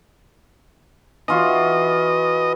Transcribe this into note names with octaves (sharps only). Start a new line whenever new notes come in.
E3 F4 F#4 D#5